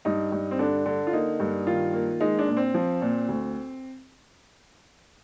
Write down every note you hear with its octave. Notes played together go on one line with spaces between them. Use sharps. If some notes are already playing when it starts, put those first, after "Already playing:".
G2 D#4
G2
C4
D3 D4
D3
F4
A#3 D#4
G2
D#3 F4
A#3
G#3 D#4
D4
A#2
C4
F3
A#2
D2